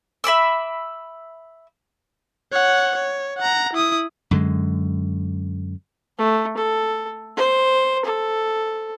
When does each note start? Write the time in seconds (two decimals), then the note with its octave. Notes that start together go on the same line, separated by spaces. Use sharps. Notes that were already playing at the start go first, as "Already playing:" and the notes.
0.24 E5 B5 D6 E6
2.52 C#5 F#5
2.95 C#5
3.38 F#5 A#5
3.73 E4 D#6
4.31 F#2 D3 G#3
6.18 A3
6.57 A4
7.37 C5
8.05 A4